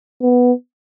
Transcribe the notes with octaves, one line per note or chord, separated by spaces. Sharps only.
B3